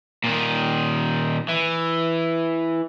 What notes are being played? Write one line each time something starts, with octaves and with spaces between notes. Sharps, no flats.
A#2 D#3
E3